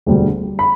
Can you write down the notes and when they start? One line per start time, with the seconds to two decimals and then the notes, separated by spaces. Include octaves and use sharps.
0.06 E1 D2 D3 G3
0.59 B5